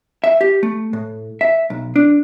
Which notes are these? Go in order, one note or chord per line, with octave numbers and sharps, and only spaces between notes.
E5
G4
A3
A2
E5
B1
D4